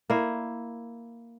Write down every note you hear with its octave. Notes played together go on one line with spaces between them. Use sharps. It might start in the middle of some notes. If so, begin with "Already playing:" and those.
A#3 E4